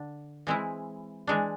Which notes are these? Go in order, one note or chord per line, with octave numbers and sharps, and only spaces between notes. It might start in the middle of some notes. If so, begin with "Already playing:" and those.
Already playing: D3 D4
E3 G#3 C4 E4
E3 G#3 D4